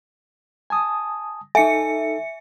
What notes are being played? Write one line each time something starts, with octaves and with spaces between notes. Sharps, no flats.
G#5 A5 D#6
D#4 A4 E5 G#5 C#7